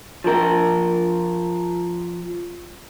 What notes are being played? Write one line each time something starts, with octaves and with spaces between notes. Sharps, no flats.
F3 A#4